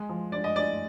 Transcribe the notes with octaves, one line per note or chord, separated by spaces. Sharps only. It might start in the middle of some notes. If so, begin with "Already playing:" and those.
Already playing: G#3
F3
G2 D5
D#5
G2 D5